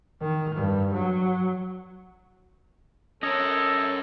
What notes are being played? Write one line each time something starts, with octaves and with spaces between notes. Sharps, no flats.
D#3
G2
F#3
C#4 A4 A#4 C#5 D#5